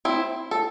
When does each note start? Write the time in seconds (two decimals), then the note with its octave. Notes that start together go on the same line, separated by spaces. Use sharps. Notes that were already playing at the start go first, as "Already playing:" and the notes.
0.05 C4 E4
0.51 A4